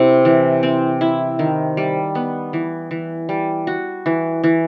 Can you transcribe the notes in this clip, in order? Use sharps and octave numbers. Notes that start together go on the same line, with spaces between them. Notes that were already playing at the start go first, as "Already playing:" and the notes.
Already playing: C3 E4
E3
C4
E4
D#3
G3
B3
E3
E3
G3
F#4
E3
E3